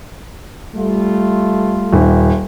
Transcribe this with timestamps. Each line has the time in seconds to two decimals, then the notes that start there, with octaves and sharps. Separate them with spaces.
0.75 G3 A3 F4
1.93 D#1